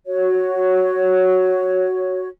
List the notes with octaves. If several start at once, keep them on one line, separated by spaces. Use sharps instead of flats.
F#4 C#5